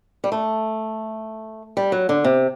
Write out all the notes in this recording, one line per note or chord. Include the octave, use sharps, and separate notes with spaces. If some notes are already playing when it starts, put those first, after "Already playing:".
G3
A3
G3
F#3
D3
C3